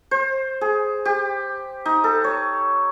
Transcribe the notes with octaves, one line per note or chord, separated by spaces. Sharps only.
C5
G#4
G4
D#4
A4
C#5